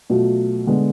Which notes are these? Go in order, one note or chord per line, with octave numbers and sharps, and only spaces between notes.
B2 F#3 A3 F4
D3 G#3 B3